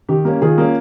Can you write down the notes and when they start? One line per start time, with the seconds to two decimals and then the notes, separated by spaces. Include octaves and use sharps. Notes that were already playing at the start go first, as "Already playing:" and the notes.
0.08 D#3 G4
0.25 A#3 C#4
0.41 D#3 F4 G#4
0.58 A#3 C#4